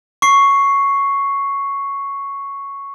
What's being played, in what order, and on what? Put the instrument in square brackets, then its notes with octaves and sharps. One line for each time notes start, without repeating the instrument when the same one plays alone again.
[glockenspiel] C#6 C7